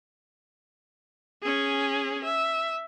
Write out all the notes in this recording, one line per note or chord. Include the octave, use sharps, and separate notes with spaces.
C#4 G#4
E5